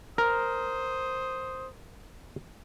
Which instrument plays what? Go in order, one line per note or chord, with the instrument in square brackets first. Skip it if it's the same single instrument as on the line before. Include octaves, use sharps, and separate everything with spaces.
[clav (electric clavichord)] A#4 [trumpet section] C5 D#6